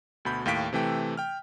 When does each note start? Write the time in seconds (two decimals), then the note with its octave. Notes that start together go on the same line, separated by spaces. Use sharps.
0.25 D2 B2 B5 G6
0.46 D#2 A2 F5 G5 B6 D7
0.73 C3 E3 A3 G5
1.17 G5 F6